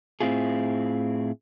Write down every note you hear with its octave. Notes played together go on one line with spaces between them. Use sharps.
A2 C4 E4 F4 G#4